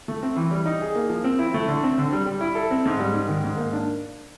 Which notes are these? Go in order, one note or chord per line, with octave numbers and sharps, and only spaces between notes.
A3
C4
E3
G3
D#4
G#4
A#3
F3
C4
E4
A3
D3
C4
D3
G3
G3
E4
A4
C4
G#2
G3
G#2
D#3
G#2
A#3
D4